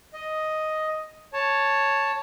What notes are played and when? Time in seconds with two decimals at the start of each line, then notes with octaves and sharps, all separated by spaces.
0.13 D#5
1.33 C#5 A5